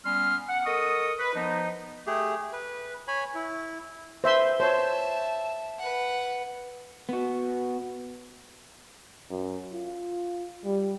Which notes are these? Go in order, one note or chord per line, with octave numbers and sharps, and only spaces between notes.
G3 B3 C#4 C6 F6
F#5
A4 A#4 D#5 C#6 D#6
B4
F3 B3 D#4
A3 G4 G#4
B4
C#5 G#5 B5
E4
B4 C5 E5 C6
C5 C#5 E5 A5
B4 F#5
B3 F#4
F#2
F4
G3